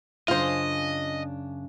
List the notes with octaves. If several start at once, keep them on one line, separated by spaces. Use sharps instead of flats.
F#2 C#3 D4 F4 C5 D#5